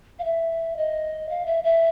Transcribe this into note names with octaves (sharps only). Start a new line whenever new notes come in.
F5
E5
D#5
F5
E5
E5